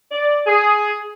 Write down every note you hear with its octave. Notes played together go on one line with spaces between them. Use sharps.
D5
G#4